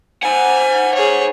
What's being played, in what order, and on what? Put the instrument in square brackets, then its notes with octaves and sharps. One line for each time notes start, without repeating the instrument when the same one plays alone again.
[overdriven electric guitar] C5 F#5 [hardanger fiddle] G#5
[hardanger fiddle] G#4 C#5